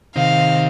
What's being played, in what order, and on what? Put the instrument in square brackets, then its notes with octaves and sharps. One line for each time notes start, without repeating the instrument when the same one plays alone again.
[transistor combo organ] C3 D#3 [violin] F5